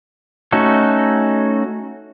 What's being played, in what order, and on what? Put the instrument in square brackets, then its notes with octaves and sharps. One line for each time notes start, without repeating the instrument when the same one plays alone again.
[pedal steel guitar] A3 C#4 D#4 F#4 A4